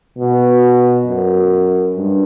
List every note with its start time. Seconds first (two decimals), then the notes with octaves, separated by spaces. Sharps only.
0.18 B2
1.06 F#2
1.96 G2